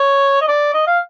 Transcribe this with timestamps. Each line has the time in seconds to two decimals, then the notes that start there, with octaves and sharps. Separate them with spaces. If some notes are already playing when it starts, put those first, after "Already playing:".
Already playing: C#5
0.41 D#5
0.48 D5
0.74 D#5
0.87 F5